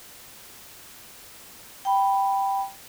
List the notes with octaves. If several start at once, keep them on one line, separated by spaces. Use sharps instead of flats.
G5 B5